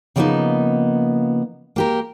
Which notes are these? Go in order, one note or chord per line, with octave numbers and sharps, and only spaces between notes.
C#3 F3 G3 A#3 B3 D#4
A#3 G4 A#4